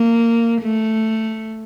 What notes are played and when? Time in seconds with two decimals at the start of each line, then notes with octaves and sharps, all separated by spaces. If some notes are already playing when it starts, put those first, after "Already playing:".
Already playing: A#3
0.62 A3